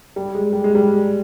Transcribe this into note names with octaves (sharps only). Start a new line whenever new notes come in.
G3
G#3
G3
G#3
G3